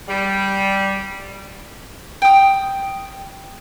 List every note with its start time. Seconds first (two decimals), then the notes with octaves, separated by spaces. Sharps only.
0.08 G3
2.22 G5 D#6